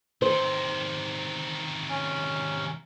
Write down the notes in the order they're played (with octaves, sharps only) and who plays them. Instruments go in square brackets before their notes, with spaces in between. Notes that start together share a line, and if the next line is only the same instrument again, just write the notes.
[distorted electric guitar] C3 D#3 [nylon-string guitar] C5
[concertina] C#4